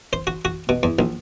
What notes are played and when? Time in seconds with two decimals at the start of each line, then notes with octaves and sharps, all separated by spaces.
0.13 C5
0.27 F#4
0.45 F#4
0.69 B2
0.83 E2
0.99 A#1